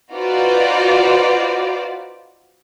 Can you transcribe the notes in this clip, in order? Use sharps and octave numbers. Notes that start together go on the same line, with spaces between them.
D#4 F4 F#4 B4 C5 D5